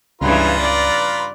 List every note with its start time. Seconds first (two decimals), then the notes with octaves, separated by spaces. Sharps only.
0.21 C#2 G2 C#3 E3 F4 B4 A#5
0.60 D5